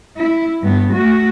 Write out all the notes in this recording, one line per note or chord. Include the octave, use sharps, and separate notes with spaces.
E4
G2 B3
A3 F#4